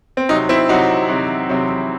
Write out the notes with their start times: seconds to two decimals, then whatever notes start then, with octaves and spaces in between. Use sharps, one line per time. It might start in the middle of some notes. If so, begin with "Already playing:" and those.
0.17 C4
0.29 C3 F#3 C4 D#4
0.49 C4 E4
0.69 C3 F#3 C4 D#4 F#4
1.09 C3 F#3 C4
1.49 C3 F#3 C4